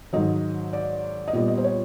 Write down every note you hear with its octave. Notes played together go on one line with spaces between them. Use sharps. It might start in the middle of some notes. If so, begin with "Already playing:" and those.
G#2 D#3 F#3 D#5
D5
D#5
A#2 G3 B3 D5
D#5
C5
C#5